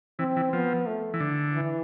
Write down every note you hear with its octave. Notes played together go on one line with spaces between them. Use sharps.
E3 C4
E3
F3 B3
A3
E3
D3
E3